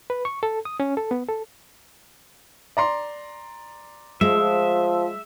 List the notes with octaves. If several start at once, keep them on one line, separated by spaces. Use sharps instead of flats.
B4
C#6
A4
D#6
C#4
A4
B3
A4
D5 A#5 C6
F3 G#3 E5